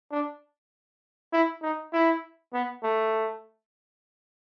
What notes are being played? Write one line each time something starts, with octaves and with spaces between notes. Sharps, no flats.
D4
E4
D#4
E4
B3
A3